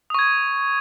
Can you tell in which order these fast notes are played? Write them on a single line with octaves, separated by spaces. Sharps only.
D#6 C#6 G#6